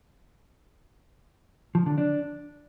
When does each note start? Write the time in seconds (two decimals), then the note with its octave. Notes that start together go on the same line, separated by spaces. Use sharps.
1.75 F3
1.86 D3
1.98 D4